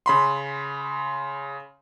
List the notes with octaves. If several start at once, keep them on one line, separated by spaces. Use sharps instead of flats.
C#3 B5 C6